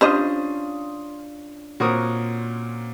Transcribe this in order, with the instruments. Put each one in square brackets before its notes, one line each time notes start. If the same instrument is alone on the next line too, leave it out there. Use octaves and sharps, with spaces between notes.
[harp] C#4 D4 F4 [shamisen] G4 C5 D#5 [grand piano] C6 D#6
[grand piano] A#2 C4 A#4 [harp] F#4 C#5 D#6